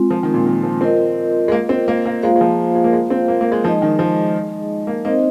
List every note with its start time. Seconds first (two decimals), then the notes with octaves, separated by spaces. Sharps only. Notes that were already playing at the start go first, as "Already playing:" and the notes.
Already playing: G#3 C4 F4
0.10 F3
0.23 D#3
0.34 A#2
0.46 D#3
0.63 F3
0.81 C4 F4 A#4 D#5
1.48 G#3
1.52 A#3
1.69 C4
1.88 A#3
2.06 A#3
2.22 G#3 A#3 F4 C5 F5
2.36 G#3
2.41 F3
2.75 G#3
2.84 A#3
2.93 G#3
3.10 C4
3.28 A#3
3.41 A#3
3.52 G#3
3.63 F3 G#3 D#4 G#4 D#5
3.82 D#3
3.99 F3
4.87 A#3
5.05 A#3 C4 D#4 C5 D#5